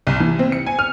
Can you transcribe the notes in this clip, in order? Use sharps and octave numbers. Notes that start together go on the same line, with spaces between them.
C2
E3
C4
C#7
G#5
F6